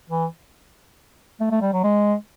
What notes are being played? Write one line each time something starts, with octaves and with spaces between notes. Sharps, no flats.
E3
A3
A3
G3
F#3
G#3